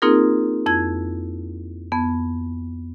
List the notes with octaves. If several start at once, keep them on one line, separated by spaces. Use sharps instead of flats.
A#3 C4 D#4 F4 G#4 A#4
F2 E4 G#6
F2 B3